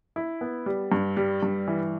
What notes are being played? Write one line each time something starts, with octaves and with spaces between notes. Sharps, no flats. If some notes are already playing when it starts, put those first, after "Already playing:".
E4
B3
G3
G2
G3
G2
E3